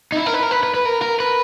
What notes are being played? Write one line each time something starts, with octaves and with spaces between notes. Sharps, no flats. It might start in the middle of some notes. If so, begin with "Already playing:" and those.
D#4
E4
A#4
B4
A#4
B4
B4
B4
A#4
A#4
B4